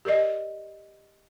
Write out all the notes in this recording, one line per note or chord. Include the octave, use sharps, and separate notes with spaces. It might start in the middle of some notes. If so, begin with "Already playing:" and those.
G4 A#4 D5 D#5